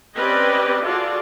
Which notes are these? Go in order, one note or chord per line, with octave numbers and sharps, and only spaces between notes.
C4 C#4 G4 B4 D5 D#5
F4 F#4 G#4 A4 D5